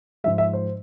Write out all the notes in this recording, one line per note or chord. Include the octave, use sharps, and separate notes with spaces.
G#2 F3 G#3 E5
E5
C5